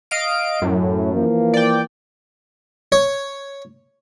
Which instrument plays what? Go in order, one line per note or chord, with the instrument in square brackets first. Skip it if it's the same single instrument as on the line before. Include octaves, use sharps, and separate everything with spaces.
[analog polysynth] D#5 F5 D7
[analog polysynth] F#2 [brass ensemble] A2
[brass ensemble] E3 F3 A#3
[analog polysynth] D5 G5
[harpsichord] C#5